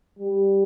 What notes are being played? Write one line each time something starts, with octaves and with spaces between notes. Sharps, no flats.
G3